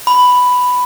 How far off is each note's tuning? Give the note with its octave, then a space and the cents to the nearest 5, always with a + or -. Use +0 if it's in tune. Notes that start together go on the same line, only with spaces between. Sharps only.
B5 +5